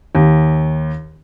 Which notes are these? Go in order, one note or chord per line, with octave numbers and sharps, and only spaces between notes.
D#2